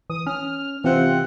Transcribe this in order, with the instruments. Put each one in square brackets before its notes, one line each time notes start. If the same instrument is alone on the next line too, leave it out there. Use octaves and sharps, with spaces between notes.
[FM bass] E3 [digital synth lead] D#6
[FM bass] C#4 [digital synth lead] F6
[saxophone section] C3 F4 F#5 [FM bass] E3 [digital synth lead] C4